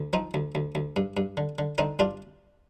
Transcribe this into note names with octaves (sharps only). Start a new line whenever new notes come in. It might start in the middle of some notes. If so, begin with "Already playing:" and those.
Already playing: D2
F3 C4 D#4
D2
D2
D2
G2
G2
D3
D3
D3 C4 D#4
G2 D4 F4